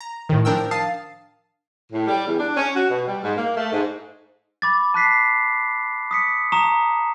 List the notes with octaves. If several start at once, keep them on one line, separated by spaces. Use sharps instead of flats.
A#5
A2 D#3
F3 D4 A#4 G5 E6
F5 A5 D#6 A6 C7
A2
G3
E2
D4
C#4
F#4
B2
G3
G#2
A#3
A3
G#2
B5 D6 A6
A5 F#6 B6 C7
D#6 B6 C#7
A5 A#5 C#6 D#6 E7